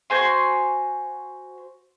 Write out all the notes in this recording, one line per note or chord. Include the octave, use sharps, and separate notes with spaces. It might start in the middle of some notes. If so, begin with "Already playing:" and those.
F#4 C5 G#5 C6